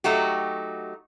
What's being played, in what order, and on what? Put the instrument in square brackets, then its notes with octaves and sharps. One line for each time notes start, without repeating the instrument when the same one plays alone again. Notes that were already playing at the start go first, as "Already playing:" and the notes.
[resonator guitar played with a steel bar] F#3 A3 D#4 F#4 G4